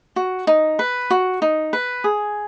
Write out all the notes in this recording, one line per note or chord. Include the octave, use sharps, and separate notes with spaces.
F#4
D#4
B4
F#4
D#4
B4
G#4